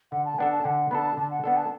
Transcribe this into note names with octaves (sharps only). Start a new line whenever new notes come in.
D3 F#5
A5
B3 D4 A4 F#5
A5
D3 F#5
B3 D4 A4 A5 B5
D3 A5
F#5
B3 D4 A4 F#5
A5